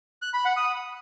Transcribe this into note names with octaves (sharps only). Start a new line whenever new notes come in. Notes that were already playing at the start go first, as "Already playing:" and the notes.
F#6
B5
F#5
D#6